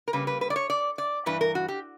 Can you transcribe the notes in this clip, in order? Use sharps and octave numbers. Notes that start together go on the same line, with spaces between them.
A#4
C#3 G3 A#3 B4
B4
B4
D5
C#5
D5
D5
G2 E3 B4
A#4
F#4
G4